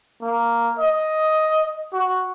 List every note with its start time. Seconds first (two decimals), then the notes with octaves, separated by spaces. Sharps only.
0.22 A#3
0.79 D#5
1.93 F#4